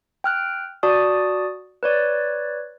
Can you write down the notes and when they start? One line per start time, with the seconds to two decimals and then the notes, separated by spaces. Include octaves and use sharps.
0.24 G5 F6 F#6
0.83 F#4 D5 A5 D#6
1.83 B4 C#5 D5